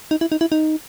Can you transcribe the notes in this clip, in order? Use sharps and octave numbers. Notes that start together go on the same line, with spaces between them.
D#4
E4
D#4
E4
D#4